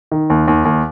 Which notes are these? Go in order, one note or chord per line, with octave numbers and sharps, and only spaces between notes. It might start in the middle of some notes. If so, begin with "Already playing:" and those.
D#3
D#2
D#2
D#2